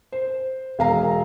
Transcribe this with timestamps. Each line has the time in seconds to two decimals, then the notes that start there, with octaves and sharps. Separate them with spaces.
0.12 C5
0.79 E1 F5 A#5